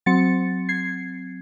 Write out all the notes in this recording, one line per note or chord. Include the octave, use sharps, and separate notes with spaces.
F#3 C4 A6 C#7
G#6 C7